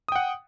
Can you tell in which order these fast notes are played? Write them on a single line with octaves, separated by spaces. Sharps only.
D#6 G5 F#5